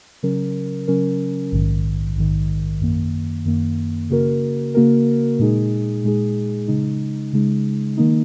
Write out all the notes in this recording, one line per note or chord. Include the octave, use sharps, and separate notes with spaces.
C#3 F#3 C#4 A#4
C#3 F#3 C#4 A#4
A#1 G#2 D#3
A#1 G#2 D#3
F#2 D#3 A#3
F#2 D#3 A#3
C#3 A#3 F#4 A#4
C#3 A#3 F#4 A#4
A#2 G#3 D#4 G#4
A#2 G#3 D#4 G#4
C#3 G#3 D#4
C#3 G#3 D#4
D#3 A#3 D#4